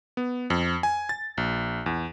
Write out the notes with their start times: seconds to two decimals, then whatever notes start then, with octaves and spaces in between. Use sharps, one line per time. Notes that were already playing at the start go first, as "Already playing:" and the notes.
0.17 B3
0.50 F2
0.83 G#5
1.09 A6
1.38 A#1
1.86 E2